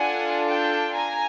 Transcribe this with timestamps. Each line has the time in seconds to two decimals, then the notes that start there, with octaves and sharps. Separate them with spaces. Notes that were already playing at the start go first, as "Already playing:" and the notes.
Already playing: D4 F4 A4 F#5 G#5
0.49 G5 A5
0.95 G#5 A#5